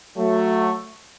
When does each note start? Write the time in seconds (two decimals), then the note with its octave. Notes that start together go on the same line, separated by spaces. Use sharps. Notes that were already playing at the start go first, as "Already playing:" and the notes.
0.17 F#3 A3